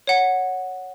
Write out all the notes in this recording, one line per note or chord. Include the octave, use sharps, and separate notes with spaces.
C#5 F#5